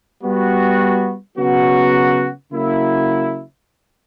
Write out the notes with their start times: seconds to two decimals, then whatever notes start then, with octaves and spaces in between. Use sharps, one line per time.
0.23 G3 B3 F#4
1.37 C#3 F#3 B3 F#4
2.51 C#3 F#3 A#3 E4